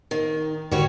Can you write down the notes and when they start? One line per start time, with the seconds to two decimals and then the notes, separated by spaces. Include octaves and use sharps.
0.11 D#3
0.71 G#2 D3 G3 F#4 C#5